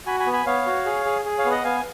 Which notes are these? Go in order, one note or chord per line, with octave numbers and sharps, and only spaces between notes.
F#4 G#5 B5
G#5 B5
B3
G#5 B5
B3 C#5 F5
F#4
G#4
G#4
G#4
C#5 F5
B3
D#5 F#5
B3 F5 G#5